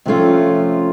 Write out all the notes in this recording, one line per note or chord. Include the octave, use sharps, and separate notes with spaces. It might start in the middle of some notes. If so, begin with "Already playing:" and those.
C3 F3 A3 C#4 F4